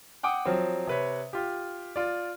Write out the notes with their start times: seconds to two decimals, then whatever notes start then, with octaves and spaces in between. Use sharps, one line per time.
0.23 F#5 G5 D6 D#6
0.45 F3 F#3 C4
0.87 C3 B4 C#5
1.33 F4 G4
1.96 F4 D5